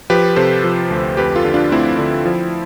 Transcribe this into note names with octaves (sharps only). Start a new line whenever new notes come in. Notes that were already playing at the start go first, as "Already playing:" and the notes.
F3 G4 B4
C3 A4 C5
F3
D2
F2 G4 B4
F4 A4
D3
D4 F4
A3 C4 E4
D3
F3